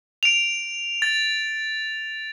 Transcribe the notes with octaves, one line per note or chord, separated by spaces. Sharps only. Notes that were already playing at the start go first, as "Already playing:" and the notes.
D7 F7
A6